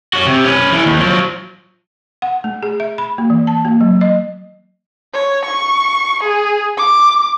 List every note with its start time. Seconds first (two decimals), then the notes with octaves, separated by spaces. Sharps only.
0.13 C#4 F#4
0.26 C3
0.45 C#4 B4
0.72 E3 A4
0.86 D#2
0.98 F3 F#3
2.22 F#5
2.44 A3
2.63 G#4
2.80 E5
2.98 B5
3.18 A#3
3.30 E3
3.47 A5
3.65 A#3
3.81 F#3
4.01 D#5
5.13 C#5
5.45 C#6
6.23 G#4
6.77 D6